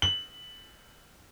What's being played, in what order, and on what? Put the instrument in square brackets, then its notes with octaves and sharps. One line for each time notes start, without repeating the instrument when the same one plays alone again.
[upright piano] F#7